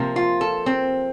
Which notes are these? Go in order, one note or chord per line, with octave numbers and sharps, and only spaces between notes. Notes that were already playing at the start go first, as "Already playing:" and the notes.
Already playing: C3 F3 A#3
F4
A4
C4